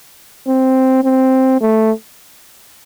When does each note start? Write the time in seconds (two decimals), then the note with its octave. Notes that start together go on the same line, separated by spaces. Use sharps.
0.48 C4
1.04 C4
1.61 A3